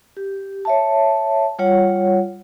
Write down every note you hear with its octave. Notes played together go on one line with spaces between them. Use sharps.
G4
C#5 E5 A5
G3 F4 C#5 F#5